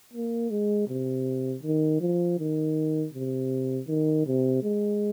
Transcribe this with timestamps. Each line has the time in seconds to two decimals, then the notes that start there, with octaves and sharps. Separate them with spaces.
0.13 A#3
0.50 G#3
0.88 C3
1.63 D#3
2.01 F3
2.39 D#3
3.13 C3
3.88 D#3
4.26 C3
4.63 G#3